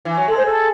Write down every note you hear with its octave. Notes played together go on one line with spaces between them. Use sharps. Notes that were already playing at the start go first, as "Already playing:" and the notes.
E3
F#3
G#3 A4
C5
A4